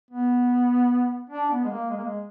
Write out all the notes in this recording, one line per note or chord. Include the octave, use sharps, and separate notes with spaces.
B3
D4
B3
G#3
A#3
G#3
A#3
G#3